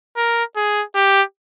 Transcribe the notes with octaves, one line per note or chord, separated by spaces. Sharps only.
A#4
G#4
G4